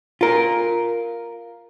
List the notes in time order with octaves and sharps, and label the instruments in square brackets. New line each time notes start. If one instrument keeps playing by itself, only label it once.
[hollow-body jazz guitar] F4 A#4